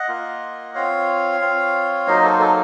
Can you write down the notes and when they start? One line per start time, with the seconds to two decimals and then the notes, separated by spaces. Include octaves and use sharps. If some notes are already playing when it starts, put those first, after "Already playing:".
Already playing: D#5 F#5
0.08 A#3 F4
0.75 C4 F4 C#5 F5
1.41 C4 F4
2.07 F#3 A#3 D#4 C5 D#5
2.24 A4 C5
2.40 A4